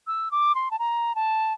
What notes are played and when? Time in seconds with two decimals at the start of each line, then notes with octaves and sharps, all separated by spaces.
0.07 E6
0.31 D6
0.55 C6
0.71 A5
0.79 A#5
1.15 A5